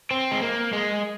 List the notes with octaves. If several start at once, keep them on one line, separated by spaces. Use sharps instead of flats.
C4
G#3
A#3
G#3